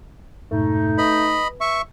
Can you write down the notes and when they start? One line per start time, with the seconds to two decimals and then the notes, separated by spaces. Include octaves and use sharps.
0.51 F2 G#2 B2 A3 D#4
0.98 B4 D#5 B5
1.61 E5 C#6